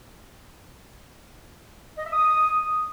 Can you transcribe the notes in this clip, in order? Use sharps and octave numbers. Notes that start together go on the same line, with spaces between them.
D#5
E5
D#6